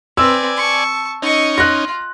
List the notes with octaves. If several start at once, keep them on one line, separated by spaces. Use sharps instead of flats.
C4 B4 D5 G#5 E6
A5 C#6
C#4 D#4 D#5 C#6
F4 F#6 A#6